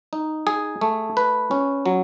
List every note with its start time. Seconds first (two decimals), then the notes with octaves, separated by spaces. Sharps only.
0.13 D#4
0.47 G#4
0.81 A3
1.17 B4
1.51 C#4
1.86 F#3